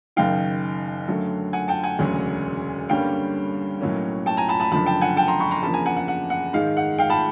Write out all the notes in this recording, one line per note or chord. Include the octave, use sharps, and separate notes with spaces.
F#1 F#2 D#3 F5 G5
F#2 D3 F#3 A3
F#5 G#5
G5 A5
F#5 G#5
E1 D2 C#3 F#3
G2 D3 G3 A#3 C#4 F5 G5
B1 A2 F#3 A#3 C#4
G5 A5
G#5 A#5
A5 B5
A5 B5
F#1 F#2 D3 F3 A5 B5
G5 A5
F#5 G#5
G5 A5
A#5 C6
B5 C#6
A#5 C6
E2 C#3 F3 A#3 D4 A5 B5
G#5 A#5
F#5 G#5
F#5
F#5
F#5
G#2 D#3 G#3 F5
F#5
F5 G5
A5 B5